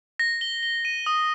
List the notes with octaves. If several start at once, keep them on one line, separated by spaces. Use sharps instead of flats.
A#6
G7
G7
D#7
D#6